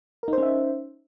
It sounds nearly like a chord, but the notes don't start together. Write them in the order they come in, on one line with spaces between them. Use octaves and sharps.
A#4 D#4 C5 C#4 E5